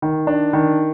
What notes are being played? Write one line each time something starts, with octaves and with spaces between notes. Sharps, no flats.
D#3
D4
D#3